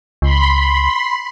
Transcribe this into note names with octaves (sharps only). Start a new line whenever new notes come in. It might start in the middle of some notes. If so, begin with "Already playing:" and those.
C#2 B5 C6